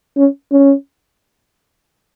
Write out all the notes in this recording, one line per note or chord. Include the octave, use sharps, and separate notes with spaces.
C#4
C#4